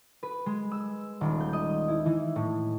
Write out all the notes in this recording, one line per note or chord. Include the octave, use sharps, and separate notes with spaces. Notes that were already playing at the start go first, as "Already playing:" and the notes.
B4
G#3
E6
D#1
G6
D#5
E4
E3
A2